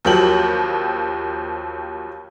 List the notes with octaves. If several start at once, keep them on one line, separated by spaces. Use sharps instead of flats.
D#2 F3 F#3 G4 F#7